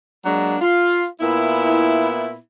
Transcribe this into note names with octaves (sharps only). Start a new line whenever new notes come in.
F#3 G#3 A#3 D4
F4
A#2 B3 E4